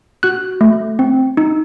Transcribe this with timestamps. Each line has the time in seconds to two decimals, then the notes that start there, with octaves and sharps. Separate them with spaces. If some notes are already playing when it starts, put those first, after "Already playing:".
0.23 F#4 F#6
0.61 A3
0.99 C4
1.37 D#4